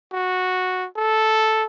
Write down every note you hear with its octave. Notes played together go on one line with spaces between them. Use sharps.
F#4
A4